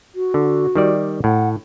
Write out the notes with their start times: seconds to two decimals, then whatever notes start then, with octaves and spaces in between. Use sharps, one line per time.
0.15 F#4
0.34 D3
0.75 D#3 G3 D5
1.24 A2 F#5